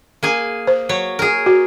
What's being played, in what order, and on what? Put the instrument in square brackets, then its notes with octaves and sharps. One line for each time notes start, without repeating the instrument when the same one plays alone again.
[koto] A#3 G#4 G#5
[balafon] C5
[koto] F#3 C#5
G#4 A#4
[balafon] F#4